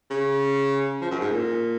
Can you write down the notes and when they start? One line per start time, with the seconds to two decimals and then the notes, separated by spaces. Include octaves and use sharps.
0.10 C#3
1.01 F3
1.11 F#2
1.21 G#2
1.31 A#2